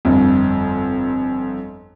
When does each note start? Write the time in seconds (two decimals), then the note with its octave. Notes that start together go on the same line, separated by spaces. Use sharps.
0.05 G1 F2